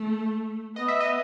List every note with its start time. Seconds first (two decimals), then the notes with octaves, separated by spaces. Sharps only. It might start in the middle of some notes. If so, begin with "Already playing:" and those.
Already playing: A3 A5
0.76 B3 D#5
0.88 E5
1.00 D#5